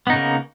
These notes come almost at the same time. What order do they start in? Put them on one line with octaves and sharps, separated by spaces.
B3 D#4 C#3 A#3